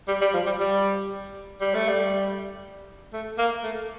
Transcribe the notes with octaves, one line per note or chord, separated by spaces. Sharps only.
G3
G3
F3
G3
G3
G3
A3
G3
A3
A#3
A3